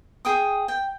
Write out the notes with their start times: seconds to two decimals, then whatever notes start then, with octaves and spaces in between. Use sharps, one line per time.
0.25 G#4 G5 D#6
0.68 G5